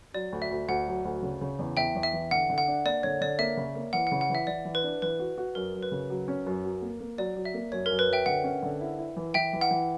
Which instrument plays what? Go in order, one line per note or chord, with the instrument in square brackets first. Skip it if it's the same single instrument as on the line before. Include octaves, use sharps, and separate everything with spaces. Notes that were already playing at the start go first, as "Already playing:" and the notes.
[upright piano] F#3 [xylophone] D5
[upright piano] D2
[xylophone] E5
[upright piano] D2
[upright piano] D2 [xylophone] F#5
[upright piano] F#3
D2
C#3
C#3
E2
[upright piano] E2 [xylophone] E5 G5
[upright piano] E2
[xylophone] E5
[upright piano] E3
[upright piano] D3 [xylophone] F#5
[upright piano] D3
[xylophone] F#5
[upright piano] D4
[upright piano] A#3 [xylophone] D5
[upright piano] D3 [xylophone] C#5
[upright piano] D3 [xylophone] D5
[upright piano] A#3 [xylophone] E5
[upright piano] C#3
A#3
[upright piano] E3 [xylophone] F#5
[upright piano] C#3 [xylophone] F#5
[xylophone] F#5
[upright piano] E3
[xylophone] E5
[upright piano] E3 [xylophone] D5
[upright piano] E3
[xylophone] B4
[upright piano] D4
[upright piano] E3 [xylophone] B4
[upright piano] F#4
F#4
[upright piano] F#2 [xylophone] A#4
[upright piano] F#2
[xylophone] B4
[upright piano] C#3
F#3
C#4
F#2
F#3
A#3
A#3
[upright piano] F#3 [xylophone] D5
[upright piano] F#3
[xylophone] E5
[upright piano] A#3
[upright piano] F#2 [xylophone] C#5
[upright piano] F#2 [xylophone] A#4
[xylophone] B4
[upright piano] F#3 [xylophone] E5 G5
[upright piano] D3 [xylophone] F#5
[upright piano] C#4
D3
E4
E4
E3
[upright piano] E3 [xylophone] E5 G5
[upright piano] E3
[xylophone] F#5
[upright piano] E3